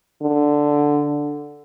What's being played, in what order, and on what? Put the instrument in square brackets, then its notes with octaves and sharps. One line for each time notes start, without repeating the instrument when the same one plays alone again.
[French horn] D3